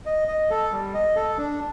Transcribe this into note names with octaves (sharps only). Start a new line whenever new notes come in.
D#5
D#5
A4
G3
D#5
A4
D4